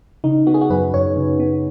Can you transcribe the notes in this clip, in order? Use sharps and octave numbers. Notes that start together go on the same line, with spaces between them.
C#3 D#4
B3 F#4
G#4
F#4
F#2 B4
F#2 C#5
C#3
B3